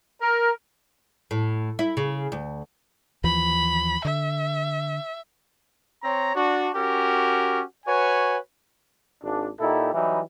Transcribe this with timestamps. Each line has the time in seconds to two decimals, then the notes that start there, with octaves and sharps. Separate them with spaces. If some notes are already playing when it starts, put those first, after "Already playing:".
0.21 A#4
1.31 A2
1.79 E4
1.97 C#3
2.32 D2
3.24 D#2 E3 F3 B5
4.05 D3 E5
6.03 C4 C#5 A#5
6.36 D4 F#4
6.75 C#4 F#4 G4 A#4
7.86 F#4 B4 C#5 G#5
9.22 G#1 D4
9.59 A#2 D#4 E4 G4 A4
9.92 E3 F#3 G3 D#4 E4